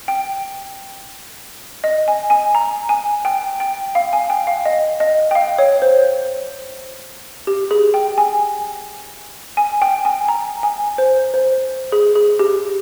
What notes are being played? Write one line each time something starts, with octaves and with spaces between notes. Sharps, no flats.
G5
D#5
G#5
G#5
A#5
G#5
G5
G5
F5
G#5
G5
F5
D#5
D#5
G5
F5
C#5
C5
G4
G#4
G5
G#5
G#5
G5
G#5
A#5
G#5
C5
C5
G#4
G#4
G4